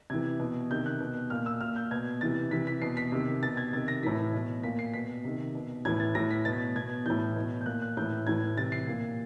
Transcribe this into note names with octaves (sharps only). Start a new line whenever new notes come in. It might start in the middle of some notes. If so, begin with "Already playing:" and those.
C3 E3 G#6
B2
C3 D#3 G6
F#6
B2
A#2 F6
E6
A#2 F6
G6
B2 G#6
C3 E3 A6
C3 E3 B6
B6
B2 C7
B6
C3 D#3
B2 A6
G#6
C3 D#3 A6
A#6
A2 E3 B6
B2
A#2 B6
C7
B2 B6
C3 D#3
B2
A2 E3 G#6
A6
A2 E3 A#6
B6
B2 A6
B2 G#6
A2 E3 G6
B2
G6
A#2 F#6
F#6
A2 E3 G6
A2 E3 G#6
C3 E3 A6
C7
A#2